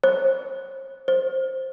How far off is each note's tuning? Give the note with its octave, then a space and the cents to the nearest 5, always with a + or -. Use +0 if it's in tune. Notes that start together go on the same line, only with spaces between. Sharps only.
C5 +40
C5 +10